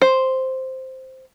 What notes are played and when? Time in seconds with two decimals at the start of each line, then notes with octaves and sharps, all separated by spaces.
0.02 C5